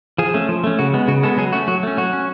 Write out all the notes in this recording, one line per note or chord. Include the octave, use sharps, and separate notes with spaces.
F3 G#4
A3 C#4
F3
A3 C#4
C#3 F#4
G#3 B3
C#3 F#4
G#3 B3 A4
F#3 G#4
A3 C#4 F#4
F#3 F#4
A3 C#4
F#3 F#4
C#4